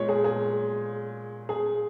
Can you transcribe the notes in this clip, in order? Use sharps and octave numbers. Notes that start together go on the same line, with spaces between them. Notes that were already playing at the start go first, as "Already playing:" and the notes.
Already playing: A#2 G#3 C#5
G#4
G#4
G#4